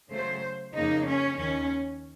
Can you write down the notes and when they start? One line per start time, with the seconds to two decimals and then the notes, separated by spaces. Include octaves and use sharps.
0.11 C#3 F#3 A3 C5
0.75 F2 C#3 F3 A#3 D#4
1.07 C#4
1.39 D#2 D#3 C#4